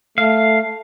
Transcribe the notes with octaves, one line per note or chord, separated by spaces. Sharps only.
A3 F5